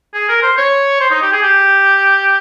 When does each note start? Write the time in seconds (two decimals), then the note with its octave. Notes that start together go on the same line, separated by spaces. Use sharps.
0.14 G#4
0.29 A#4
0.42 C5
0.57 C#5
1.00 C5
1.11 D#4
1.22 G4
1.33 G#4
1.43 G4